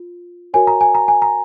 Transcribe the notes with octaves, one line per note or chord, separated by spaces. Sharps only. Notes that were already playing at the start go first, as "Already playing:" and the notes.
Already playing: F4
F#4 A#4 C#5 G#5
A#5
G#5
A#5
G#5
A#5